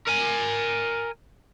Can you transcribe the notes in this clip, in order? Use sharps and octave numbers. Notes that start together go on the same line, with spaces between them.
A#4 G#5